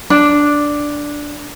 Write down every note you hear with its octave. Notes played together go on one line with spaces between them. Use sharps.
D4